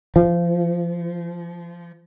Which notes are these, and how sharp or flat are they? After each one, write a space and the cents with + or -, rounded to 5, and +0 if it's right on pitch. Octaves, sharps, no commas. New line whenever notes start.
F3 -25